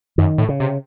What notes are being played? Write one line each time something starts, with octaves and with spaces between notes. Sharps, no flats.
F#2 D#3
A2
C#3
C3